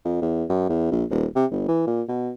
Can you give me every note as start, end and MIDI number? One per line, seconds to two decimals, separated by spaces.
0.05 0.20 41
0.22 0.44 40
0.49 0.67 42
0.69 0.87 40
0.91 1.04 34
1.10 1.26 27
1.35 1.46 48
1.51 1.64 31
1.68 1.85 52
1.87 2.02 46
2.08 2.31 47